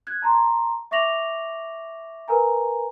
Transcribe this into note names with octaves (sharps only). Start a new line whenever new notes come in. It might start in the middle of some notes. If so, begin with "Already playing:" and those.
F#6 G#6
A5 A#5 C6
E5 C#6 D6 A#6 F7 F#7
A#4 B4 G#5 A#5